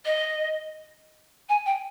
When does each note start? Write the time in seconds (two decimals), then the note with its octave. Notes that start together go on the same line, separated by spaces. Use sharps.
0.05 D#5
1.49 G#5
1.65 G5